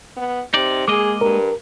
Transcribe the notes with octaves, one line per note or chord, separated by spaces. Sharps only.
B3
C3 D#4 D5
G#3 A#3 G#4 D#5 D6
G2 A#4